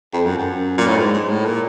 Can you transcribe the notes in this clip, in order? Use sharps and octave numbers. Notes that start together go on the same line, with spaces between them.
F2
F#2
F#2
A#2
A2
G#2
G#2
A2
A#2